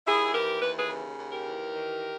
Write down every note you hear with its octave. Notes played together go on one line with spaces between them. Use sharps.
D#2 E4 G#4
E3 G4 A#4
D#2 B4
G#4 B4
C#3
D#2
G4 A#4
E3
D#3